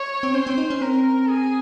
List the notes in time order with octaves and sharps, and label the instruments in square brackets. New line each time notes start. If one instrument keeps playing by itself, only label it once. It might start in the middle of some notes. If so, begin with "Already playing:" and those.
Already playing: [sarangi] C#5
[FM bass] C4
[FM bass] C#4 [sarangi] C5
[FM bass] C4
D#4
C#4
[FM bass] C4 [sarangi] A#4
[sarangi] G#4